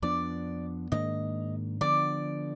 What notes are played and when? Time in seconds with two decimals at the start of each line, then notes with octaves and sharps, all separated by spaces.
0.02 F2 F3 B3 D4 D5
0.91 G#2 D#3 A#3 D4 D#5
1.81 D3 F3 B3 D5